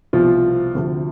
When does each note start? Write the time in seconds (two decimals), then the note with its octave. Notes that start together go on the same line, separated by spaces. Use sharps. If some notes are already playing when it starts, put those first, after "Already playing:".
0.13 C2 B2 F3 F4
0.75 D2 C3 F3